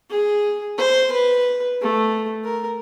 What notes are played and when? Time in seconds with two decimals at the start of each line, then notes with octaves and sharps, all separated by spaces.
0.10 G#4
0.78 C5
1.12 B4
1.81 A3
2.44 A#4